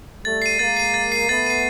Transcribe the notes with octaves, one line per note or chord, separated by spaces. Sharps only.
G3 A3 A6
C7 D#7
G#3 A#3 A6
C7 D#7
A6
C7 D#7
A3 B3 A6
C7 D#7